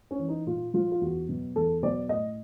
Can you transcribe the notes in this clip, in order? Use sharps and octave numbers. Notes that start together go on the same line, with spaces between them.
C#4
E3
D#4
A#2 F4
F3 F4
F4
E2 F#4
B2 F#3
E2 A4
B2 F#3 D5
A2 D#5